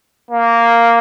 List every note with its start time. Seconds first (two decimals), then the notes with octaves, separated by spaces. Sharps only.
0.31 A#3